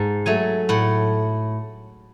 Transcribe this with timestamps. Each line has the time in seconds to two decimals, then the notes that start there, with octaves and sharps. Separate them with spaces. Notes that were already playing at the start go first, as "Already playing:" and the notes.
Already playing: G#2 A5
0.26 F#3 A3 G#5
0.69 A2 F#5